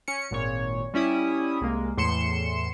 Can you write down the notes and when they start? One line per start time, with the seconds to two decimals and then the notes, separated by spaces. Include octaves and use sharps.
0.08 C#4 C#7
0.31 G#1 A#2 C#5
0.94 G3 C#4 E4 D#6
1.61 C2 G#3 A#3
1.97 E2 A2 C6 C#7 E7